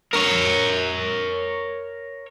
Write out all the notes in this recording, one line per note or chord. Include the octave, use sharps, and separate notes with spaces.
A#4 C#5